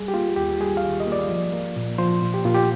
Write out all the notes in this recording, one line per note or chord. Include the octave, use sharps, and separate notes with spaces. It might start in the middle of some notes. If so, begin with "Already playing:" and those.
Already playing: G3 G#4
G4
A#3 F4
D#2 G4
G3 G#4
F5
D#3
D#5
A#3
D5
F3
A#3
A#2
F3 C5
A#2
G4
A#2 F4
G4